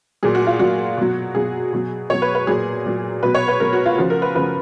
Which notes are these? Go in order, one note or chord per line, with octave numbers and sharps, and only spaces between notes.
A#2 F#3 G#4
F#4
F4
A#2 F#3 F#4
B2 F#3
B2 F#3 G#4
B2 F#3
B2 F#3 C#5
B4
B4
A#2 F#3 G#4
A#2 F#3
B2 F#3 B4
C#5
B4
B2 F#3 A#4
F#4
F4
C#3 F3 F#4
A#4
B4
C#3 F3 B4